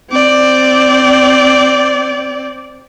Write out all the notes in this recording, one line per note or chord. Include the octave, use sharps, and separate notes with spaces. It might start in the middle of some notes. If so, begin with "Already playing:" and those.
C4 D5